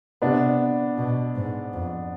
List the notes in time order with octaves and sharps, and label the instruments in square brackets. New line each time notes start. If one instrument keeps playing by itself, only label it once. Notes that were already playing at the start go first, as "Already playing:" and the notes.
[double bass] C3 [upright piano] B3 D4
[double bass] B2
G#2
F2